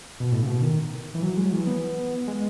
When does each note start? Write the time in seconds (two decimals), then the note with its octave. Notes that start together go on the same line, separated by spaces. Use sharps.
0.20 B2
0.32 A2
0.42 C#3
0.47 B2
0.62 D#3
1.15 E3
1.22 F#3
1.37 G#3
1.45 F#3
1.53 E3
1.67 B3
2.28 G#3